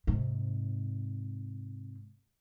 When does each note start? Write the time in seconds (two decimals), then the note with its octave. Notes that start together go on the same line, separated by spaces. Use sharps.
0.07 G#2 C3